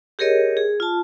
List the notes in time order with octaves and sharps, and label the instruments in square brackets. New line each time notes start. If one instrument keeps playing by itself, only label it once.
[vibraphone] G4 G#4 A#4 C#5 D#5
G#4
F4 A5